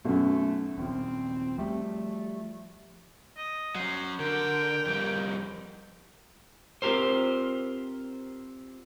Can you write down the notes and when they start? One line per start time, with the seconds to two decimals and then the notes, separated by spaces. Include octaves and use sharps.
0.05 B1 F#2 A3
0.78 D#1 F3 C4
1.58 F3 G3 A3
3.37 D#5
3.75 F#3 C#4 C5
4.20 D3 A#4 G5
4.86 F2 G3
6.82 C4 F4 G4 A#4 C5